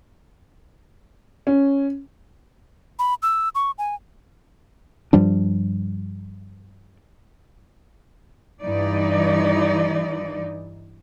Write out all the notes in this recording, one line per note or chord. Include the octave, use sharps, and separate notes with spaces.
C#4
B5
E6
C#6
G#5
G2 F3 G3 D4
G2 E3 D#4 D5